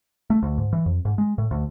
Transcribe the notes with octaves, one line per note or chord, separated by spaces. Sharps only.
A3
D2
G#2
E3
F2
G#2
G#3
A2
D2